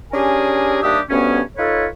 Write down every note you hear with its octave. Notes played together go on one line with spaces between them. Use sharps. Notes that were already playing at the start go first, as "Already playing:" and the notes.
C#4 D4 G4 G#4 A#4 G#5
D#2 G3 D4 G4 E5 D#6
D2 G2 B3 C#4
D#4 F4 A4 B4 C#5